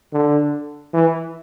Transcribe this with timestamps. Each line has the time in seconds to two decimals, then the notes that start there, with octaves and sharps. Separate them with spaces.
0.13 D3
0.94 E3